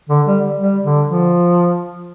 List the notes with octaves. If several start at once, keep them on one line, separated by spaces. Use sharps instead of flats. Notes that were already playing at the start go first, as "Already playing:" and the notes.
D3
G3
G3
D3
F3